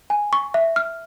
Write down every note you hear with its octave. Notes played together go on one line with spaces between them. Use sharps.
G#5
C#6
E5
F6